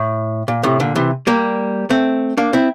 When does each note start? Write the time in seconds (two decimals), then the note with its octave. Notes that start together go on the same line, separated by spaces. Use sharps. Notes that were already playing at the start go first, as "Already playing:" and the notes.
Already playing: A2
0.48 A#2
0.63 A2 C3
0.80 A#2 D3
0.95 C3 E3
1.27 G3 A#3
1.90 A3 C4
2.37 A#3 D4
2.53 C4 E4